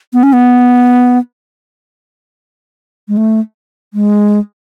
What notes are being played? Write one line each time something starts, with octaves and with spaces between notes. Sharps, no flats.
B3
C#4
B3
G#3
A3
G#3